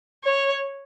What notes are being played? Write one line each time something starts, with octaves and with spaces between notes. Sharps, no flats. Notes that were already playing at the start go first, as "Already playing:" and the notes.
C#5